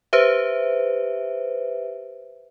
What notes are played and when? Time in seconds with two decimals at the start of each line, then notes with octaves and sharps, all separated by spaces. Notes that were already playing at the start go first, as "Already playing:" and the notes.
0.13 G4 B4 C5 E5